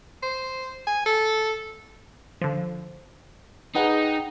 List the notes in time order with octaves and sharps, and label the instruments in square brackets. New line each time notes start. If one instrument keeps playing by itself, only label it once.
[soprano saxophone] C5
G#5
A4
[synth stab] D3 F3
[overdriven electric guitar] D#4 [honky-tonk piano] G#4 B4 [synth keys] F#5 G5 A#5